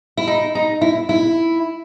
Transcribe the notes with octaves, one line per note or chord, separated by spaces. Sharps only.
E4
D#4
D#4
E4
E4